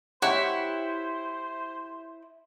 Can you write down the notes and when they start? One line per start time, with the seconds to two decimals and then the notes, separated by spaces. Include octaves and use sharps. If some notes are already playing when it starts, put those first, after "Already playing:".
0.22 E4 G4 C5 C#5 F#5